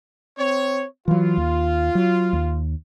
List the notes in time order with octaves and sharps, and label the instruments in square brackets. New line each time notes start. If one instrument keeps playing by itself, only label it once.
[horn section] C4 C#5
[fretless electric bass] E3 F#3 [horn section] F4
[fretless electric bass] D#2
F#3
D#2